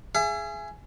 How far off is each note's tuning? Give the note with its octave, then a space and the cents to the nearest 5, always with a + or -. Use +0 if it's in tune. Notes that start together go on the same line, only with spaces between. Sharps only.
G#4 +5 E5 +40